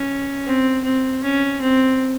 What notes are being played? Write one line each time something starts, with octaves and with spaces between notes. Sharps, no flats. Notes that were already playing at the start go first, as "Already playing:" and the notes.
Already playing: C#4
C4
C4
C#4
C4